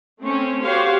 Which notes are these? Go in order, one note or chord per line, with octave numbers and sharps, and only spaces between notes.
A3 C4 C#4
F#4 G4 C5 C#5 F5